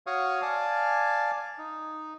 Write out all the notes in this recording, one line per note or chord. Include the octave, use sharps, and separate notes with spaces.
F#4 C#5 F5 C#6 D#6
D5 F5 G#5 A5
D#4